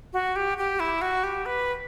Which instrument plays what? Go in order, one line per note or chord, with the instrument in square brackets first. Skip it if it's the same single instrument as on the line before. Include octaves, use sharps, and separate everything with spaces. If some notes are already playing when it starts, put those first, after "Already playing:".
[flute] F#4
G4
G4
E4
F#4
G4
B4